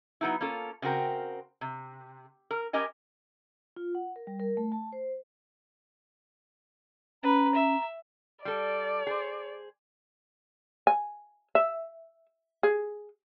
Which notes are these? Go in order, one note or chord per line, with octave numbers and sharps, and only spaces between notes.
F#3 B3 D#4 E4
A#3 C#4 F4 A4
C#3 C4 F#4 A#4 G5
C3
A#4
C#4 G4 A#4 D#5 G#5
F4
F#5
A#4
G3
A#4
A3
A5
C5
C#4 B4 A#5
E5
G3 A4 D5
G#4 C5
G#5
E5
G#4